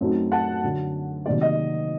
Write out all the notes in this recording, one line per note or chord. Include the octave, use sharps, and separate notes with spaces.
F#2 F#3 A3 C4 D#4
F#5 A5
F#2 D3 F#3
C3 D#3 F#3 A#3 D#4 D5
D#5